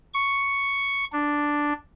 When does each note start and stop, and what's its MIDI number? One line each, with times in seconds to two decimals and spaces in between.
0.14 1.05 85
1.13 1.73 62